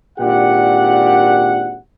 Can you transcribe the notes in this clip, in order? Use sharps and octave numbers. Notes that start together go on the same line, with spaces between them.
G#1 A#2 D4 G4 F#5